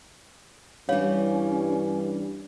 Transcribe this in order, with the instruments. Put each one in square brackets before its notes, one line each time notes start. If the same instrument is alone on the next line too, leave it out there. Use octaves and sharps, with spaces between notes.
[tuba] G2 [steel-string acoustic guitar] E3 G3 [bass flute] C#4 [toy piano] C#5 F5